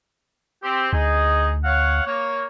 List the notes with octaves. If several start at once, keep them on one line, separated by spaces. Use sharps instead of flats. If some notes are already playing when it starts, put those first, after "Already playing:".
C4 G4
D2 D#4 G#4 D#5
C#5 F5 F#5
A#3 C#5